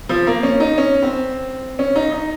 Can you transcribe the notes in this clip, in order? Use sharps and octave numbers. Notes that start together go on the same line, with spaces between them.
F3
A#3
C#4
D#4
C#4
C4
C#4
D#4
D#4